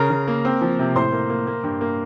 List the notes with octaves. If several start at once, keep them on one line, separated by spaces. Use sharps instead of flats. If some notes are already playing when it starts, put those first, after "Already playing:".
Already playing: C#3 A#4 A#5
C#3
A#3
C4
F3
C3
A2 C5 C6
A#3
A#3
A#3
G2
A#3